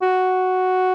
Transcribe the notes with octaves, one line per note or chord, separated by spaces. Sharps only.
F#4